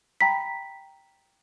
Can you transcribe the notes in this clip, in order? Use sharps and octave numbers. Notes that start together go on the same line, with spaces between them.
G5 A#5 B5 B6